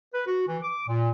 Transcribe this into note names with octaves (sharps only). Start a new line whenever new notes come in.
B4
F#4
E3
D6
A#2